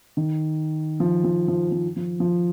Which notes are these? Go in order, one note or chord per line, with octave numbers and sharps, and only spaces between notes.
D#3
F3
F3
F3
F3
F3
F3